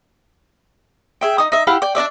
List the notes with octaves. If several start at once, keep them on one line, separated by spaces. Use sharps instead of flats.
G#4 E5 G5
D#4 D#6
D#4 E5
E4 G4 F5 F#5
D5 G5
D4 F#4 D5 E5